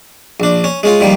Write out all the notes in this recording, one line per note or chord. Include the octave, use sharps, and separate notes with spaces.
A#1 D4
C#4
G#3 C#4 F4
A#2 D#3 F3 G3